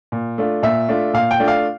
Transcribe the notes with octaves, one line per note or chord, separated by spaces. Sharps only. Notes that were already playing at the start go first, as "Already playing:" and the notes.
A#2
A3 D4 F4
A#2 E5
A3 D4 F4
A#2 F5
G5
A3 D4 F4
F5